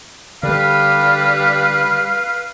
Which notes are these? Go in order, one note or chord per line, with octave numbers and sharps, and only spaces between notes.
D3 G3 B4 F5